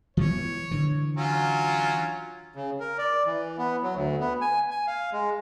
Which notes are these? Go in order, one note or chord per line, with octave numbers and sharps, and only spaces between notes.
E3 G3 B3 C#5
D3 E3
F#3 C#4 F4
C#3
A#4
D5
E3
B3
F#3
D2
B3
G#5
G#5
F5
G#3